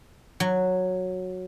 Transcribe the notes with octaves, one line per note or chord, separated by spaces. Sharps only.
F#3